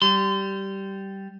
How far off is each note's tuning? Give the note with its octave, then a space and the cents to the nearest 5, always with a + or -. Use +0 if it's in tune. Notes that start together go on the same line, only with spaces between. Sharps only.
G3 -10 C6 -30